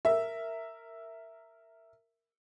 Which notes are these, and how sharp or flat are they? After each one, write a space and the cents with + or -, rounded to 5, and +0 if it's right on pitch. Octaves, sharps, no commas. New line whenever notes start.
A#4 -15 E5 +0